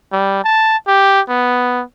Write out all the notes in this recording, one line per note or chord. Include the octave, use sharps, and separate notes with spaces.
G3
A5
G4
B3